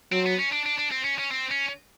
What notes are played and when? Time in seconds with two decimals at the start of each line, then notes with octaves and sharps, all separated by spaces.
0.12 F#3 C4
0.26 B3
0.39 C#4
0.52 D4
0.66 D4
0.78 D4
0.91 C4
1.04 C#4
1.19 C#4
1.31 C4
1.51 C#4